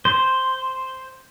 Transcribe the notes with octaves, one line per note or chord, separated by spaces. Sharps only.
C5